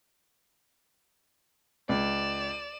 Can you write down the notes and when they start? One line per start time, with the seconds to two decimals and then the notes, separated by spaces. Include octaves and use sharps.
1.89 C#2 D5 E7